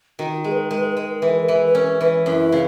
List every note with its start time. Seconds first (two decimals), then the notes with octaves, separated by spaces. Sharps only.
0.19 D#3 F#4
0.31 F#4
0.44 G#3 G#4
0.51 B4
0.57 A#4
0.71 G#3 A#4
0.78 B4
0.85 A#4
0.92 B4
0.96 G#3 A#4
1.07 B4
1.14 A#4
1.21 E3 B4
1.28 A#4
1.35 B4
1.43 A#4
1.48 E3
1.67 B4
1.75 C#4 A#4
2.01 E3 B4
2.26 F#2 E4
2.52 C#3